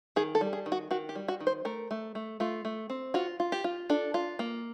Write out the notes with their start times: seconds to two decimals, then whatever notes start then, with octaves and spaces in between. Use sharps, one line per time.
0.16 D#3 G#4
0.35 A4
0.41 G3
0.53 G#4
0.66 D#3
0.72 F#4
0.91 D#3 F#4
1.09 G4
1.15 G3
1.28 F#4
1.40 D#3
1.47 C5
1.65 A3 A#4
1.91 A3
2.15 A3
2.40 A3 F4
2.65 A3
2.90 C4
3.14 F4 F#4
3.40 F4
3.52 G4
3.64 F4
3.90 D4 A4
4.14 F4
4.39 A#3